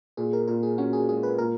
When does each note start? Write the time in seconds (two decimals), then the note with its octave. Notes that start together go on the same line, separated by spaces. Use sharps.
0.17 A#2 G#4
0.33 A#4
0.48 A#2 A#4
0.63 G#4
0.78 C#4 F#4
0.93 G#4
1.09 G#3 G#4
1.23 B4
1.38 A#2 A#4